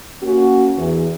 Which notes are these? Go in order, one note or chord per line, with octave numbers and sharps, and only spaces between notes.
A#3 C#4 F#4
E2